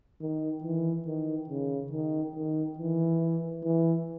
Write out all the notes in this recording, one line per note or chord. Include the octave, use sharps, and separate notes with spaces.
D#3
E3
D#3
C#3
D#3
D#3
E3
E3